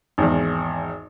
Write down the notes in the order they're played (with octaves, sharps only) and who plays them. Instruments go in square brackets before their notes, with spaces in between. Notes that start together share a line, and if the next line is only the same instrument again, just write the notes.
[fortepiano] G#1 E2